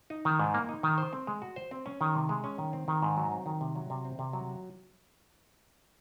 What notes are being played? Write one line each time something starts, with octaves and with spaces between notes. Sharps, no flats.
D#4
D#3
G#2
A#3
D#4
D#3
C5
C4
G#3
F#4
C5
C4
C#4
D#3
C3
G#3
C#4
D#3
C4
D#3
G#2
F#3
C4
D#3
C3
F#3
C3
C4
C3
F#3